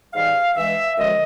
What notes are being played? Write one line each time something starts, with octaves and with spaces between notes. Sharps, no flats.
G#2 E3 G3 F5
G2 E3 G#3 E5
F#2 D3 F3 G#3 D#5